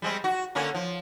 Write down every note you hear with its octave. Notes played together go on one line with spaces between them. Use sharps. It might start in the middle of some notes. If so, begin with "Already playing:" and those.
G3 G#3 C4
F#4
D3 A#3 C#4
F3